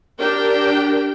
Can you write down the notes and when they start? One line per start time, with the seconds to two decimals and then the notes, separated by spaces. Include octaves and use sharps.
0.19 D4 G4 A#4 G5